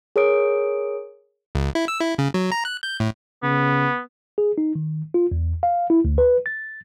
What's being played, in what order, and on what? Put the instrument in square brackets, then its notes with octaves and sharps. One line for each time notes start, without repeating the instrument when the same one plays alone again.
[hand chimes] G#4 A#4 C#5 D#6 D7
[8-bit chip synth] C#2
E4
E6
E4
C#3
F#3
A#5
F#6
G6
A2
[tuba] C#3 [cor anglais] B3
[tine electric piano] G#4
D#4
D#3
F4
E2
F5
E4
D2
B4
A6